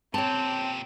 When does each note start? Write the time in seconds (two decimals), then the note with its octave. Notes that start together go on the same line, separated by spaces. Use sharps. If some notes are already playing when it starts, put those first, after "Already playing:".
0.14 A#2 C4 G4 C#5 G5 A5